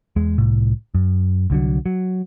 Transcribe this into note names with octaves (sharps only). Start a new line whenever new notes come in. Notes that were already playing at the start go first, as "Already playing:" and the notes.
E2 G#3
C2 A2
F#2
C2 D3 F#3
F#3